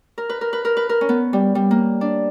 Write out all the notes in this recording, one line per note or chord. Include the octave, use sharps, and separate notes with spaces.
A#4
B4
A#4
B4
A#4
B4
A#4
C#4
B3
G3
G3
A#3
D4